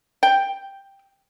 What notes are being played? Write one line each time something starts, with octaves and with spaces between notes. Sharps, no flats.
G5